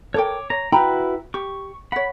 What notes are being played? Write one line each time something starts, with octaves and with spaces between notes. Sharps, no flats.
A4 A#4 C#5 G5 D6
C#5 A#5
E4 F#4 B4 G5 A#5 B5
G4 C#6
C#5 F#5 B5